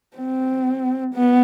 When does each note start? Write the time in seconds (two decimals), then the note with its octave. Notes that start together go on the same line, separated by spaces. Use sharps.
0.17 C4
1.14 B3